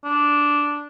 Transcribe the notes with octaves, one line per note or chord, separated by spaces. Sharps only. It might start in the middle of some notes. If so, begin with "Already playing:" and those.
D4